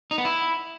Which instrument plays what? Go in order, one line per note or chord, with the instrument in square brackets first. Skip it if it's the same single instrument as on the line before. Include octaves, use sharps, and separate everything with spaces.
[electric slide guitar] D#4
B3
E4